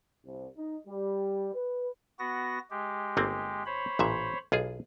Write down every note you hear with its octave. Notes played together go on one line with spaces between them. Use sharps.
C2
D#4
G3
B4
B3 F#4 A#6
G#3 G4
G1 A#3 C4
C5 C#5 B5
A1 A#2 E5
B1 F4 G#4